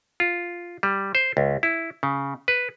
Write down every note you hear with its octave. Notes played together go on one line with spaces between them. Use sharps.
F4
G3
C5
C#2
E4
C#3
B4